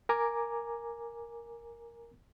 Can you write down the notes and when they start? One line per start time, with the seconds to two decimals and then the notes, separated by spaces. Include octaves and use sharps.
0.09 A#4 G#5 A#5 D6